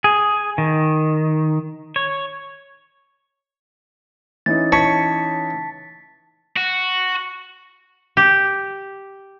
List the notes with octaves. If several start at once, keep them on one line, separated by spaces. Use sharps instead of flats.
G#4
D#3
C#5
E3 C#4 D#4 A6
C#5 A5 B6
F#4
G4